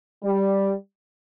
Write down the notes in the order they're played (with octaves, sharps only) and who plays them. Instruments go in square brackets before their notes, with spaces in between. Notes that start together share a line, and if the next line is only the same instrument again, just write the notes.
[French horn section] G3